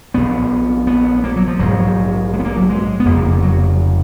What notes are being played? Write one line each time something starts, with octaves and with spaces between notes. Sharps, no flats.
A#1 A#2 B3
B3
A#3
F#3
F3
A#1 G#2 F#3
G#3
B3
A#3
F#3
G#3
B3
F1 F2 C#3 A#3
F#3